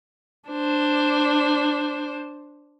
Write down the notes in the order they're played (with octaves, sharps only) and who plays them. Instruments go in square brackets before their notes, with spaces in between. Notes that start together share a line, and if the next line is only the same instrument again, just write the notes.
[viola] D4 C5